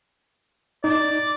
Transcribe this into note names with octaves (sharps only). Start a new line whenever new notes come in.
D#4 D5